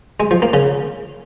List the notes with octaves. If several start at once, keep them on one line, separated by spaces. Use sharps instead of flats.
G#3
F3
A#3
C#3